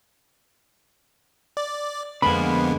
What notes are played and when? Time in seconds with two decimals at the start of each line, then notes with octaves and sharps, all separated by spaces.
1.57 D5
2.22 F2 D3 G#3 A#3 B3 B5